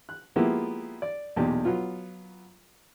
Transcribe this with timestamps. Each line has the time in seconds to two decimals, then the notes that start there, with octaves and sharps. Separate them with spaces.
0.09 F#6
0.36 F3 G#3 A#3 B3 E4 G4
1.02 D5
1.36 B1 E2 A#2 G4
1.65 F#3 B3 F4